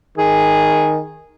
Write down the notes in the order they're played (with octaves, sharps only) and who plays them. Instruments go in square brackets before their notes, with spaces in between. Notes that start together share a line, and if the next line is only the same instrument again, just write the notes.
[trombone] D#3 [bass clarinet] G#4